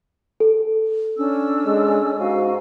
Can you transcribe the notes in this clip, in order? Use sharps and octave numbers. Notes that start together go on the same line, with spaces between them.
A4
C#4 D4 E6
G#3
G#2 F#4 F5 G#5